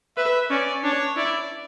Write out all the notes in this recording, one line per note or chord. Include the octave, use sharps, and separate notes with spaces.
B4 E5
C#4 D5
D4 C#5
E4 D5